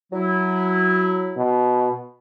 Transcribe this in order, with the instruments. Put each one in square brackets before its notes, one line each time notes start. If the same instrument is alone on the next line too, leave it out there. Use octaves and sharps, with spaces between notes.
[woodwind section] F#3 E4
[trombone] B2